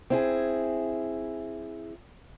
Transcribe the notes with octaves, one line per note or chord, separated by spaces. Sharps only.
C4 E4 G#4